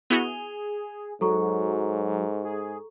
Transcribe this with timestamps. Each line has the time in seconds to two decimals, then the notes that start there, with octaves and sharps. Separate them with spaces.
0.10 B3 E4 F#4 G#4 D#7 F7 G7
1.21 G#2 F#3 A4 A#5 C#6
2.44 G#4